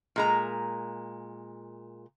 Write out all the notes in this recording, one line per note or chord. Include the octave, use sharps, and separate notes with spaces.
A#2 G#3 A#5